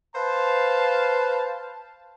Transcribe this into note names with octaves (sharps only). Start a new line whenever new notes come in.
B4 C5 F5 A5